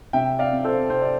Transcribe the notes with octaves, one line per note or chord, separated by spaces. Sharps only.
C3 E5 G5
D5 F5
C4
A4 C5
C3 C5
D5